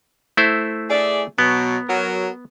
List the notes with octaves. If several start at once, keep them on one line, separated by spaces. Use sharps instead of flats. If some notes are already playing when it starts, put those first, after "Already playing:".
A3 E4 C5
G#4 D5 E5
B2 F#3 B3
F#3 A#4